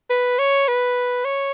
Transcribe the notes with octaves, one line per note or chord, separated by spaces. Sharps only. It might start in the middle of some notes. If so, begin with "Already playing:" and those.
B4
C#5
B4
C#5